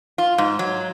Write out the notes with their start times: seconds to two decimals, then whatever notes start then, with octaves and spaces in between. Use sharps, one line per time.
0.18 F4
0.38 G#2
0.59 F#3